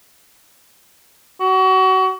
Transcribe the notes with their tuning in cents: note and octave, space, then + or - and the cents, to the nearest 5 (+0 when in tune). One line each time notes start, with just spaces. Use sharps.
F#4 +30